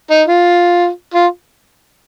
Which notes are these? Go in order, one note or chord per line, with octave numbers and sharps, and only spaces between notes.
D#4
F4
F4